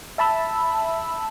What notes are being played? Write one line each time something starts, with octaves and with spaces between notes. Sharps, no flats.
E5 A5 B5 E6